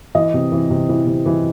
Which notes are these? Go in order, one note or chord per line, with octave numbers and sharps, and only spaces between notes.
E3 D#5
C3
E3
C3
E3
C3
E3